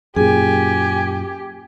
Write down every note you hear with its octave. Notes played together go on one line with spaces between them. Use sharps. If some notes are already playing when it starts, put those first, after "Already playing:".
F#2 A#2 G4 G#4 G#5